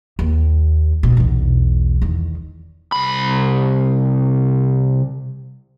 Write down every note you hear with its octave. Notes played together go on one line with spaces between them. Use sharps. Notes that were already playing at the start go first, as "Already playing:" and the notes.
D#2
B2
B1 E2
E2 D#3
C2 B5